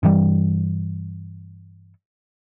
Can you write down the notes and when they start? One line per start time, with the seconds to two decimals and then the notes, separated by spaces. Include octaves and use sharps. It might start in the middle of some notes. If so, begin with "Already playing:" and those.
0.03 G2 E3 G3